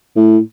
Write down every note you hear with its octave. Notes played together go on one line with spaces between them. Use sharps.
A2